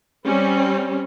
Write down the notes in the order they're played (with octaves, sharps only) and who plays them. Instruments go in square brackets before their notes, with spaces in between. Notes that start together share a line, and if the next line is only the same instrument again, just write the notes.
[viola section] G3 C4 C#4